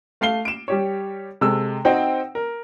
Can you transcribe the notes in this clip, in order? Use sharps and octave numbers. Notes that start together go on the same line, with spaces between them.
A3 F5 C7 G7
D7 E7
G3 G4 C#5
C3 G#3 A4 E6
C4 D#4 F#4 C5 G5
A#4